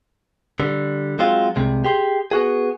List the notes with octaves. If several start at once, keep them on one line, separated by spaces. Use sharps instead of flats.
D3 G3
F#3 G#3 C4 F4
C2 C3 G#3
G4 G#4 C6
B3 F#4 G#4